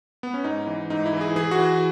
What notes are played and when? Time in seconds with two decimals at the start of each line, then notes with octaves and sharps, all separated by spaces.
0.23 B3
0.34 C#4
0.44 G#2 D#4
0.67 E3
0.90 G#2 D#4
1.06 E4
1.13 E3
1.21 G#4
1.36 E3 G#4
1.51 F#4
1.59 E3